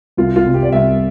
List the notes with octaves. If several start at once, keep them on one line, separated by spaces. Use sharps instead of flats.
C2 F4
F4
C3 G3
G4
D5
C2 E5